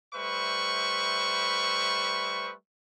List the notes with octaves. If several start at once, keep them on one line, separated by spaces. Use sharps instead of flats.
G3 A3 B4 C5 E5 C#6